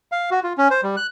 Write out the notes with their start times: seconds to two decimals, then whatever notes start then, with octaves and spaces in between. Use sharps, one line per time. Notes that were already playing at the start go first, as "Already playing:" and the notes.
0.12 F5
0.31 F#4
0.44 F4
0.58 C#4
0.71 C5
0.83 G3
0.97 F#6